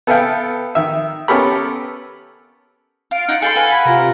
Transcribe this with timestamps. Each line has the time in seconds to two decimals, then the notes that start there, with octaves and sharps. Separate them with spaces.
0.07 B3 A4 B4 E5 F5 G5
0.75 D#3 E5
1.28 B3 C#4 G4 A4 A#4 B5
3.11 F4 F5 D7
3.29 D#4 F4 F#5
3.42 G#4 A4 G5 A5 C6
3.55 F#4 B4 F5 G#5
3.72 B5
3.85 C3 F4 A#4